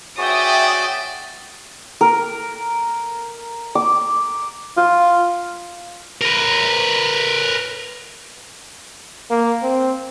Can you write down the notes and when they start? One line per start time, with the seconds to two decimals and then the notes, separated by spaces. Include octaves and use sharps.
0.18 F#4 G#4 C#5 D5 E5 G5 D#6
2.01 A#4
3.75 D6
4.77 F4
6.21 A#4 B4
9.31 A#3
9.63 C4